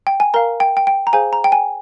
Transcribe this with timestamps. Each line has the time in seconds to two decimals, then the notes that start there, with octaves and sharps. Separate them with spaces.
0.07 G5
0.20 G#5
0.34 A#4 F5 A#5
0.60 G5
0.77 G5
0.87 G5
1.07 A#5
1.13 G#4 C5 F5 G#5
1.33 A#5
1.44 G5
1.52 G#5